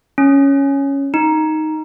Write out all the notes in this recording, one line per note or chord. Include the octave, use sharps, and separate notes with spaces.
C#4
D#4